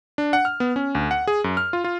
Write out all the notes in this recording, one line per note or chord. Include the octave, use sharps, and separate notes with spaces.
D4
F#5
F6
B3
C#4
D2
F#5
G#4
F#2
F6
F4
F4